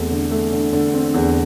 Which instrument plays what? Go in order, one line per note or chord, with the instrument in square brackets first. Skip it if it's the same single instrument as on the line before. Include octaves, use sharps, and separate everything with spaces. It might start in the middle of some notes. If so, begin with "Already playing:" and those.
Already playing: [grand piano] E2 A3 C4
D3
A3
D3
D3
C4
E2